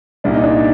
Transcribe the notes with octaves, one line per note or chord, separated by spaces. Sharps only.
C2 A#2 D4
D#4
D4